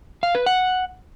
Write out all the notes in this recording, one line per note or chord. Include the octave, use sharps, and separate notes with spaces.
F5
B4
F#5